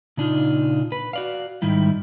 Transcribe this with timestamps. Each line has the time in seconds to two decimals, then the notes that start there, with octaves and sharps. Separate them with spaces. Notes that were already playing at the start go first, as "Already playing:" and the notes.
0.17 A#2 C#3 D4 D#4 F4
0.92 B4
1.13 F#4 D5 F5
1.62 G#2 D#3 G3 E4